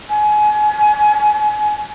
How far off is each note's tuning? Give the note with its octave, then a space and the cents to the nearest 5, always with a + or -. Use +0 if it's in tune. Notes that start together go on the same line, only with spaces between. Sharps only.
G#5 +30